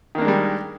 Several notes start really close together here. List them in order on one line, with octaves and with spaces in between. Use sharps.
D#3 A#3 D4 G#3 G3